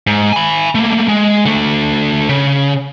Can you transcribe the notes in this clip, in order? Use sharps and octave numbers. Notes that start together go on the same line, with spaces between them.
G#2
G#5 B5
A3 A#3
G#3
D3 A3
C#3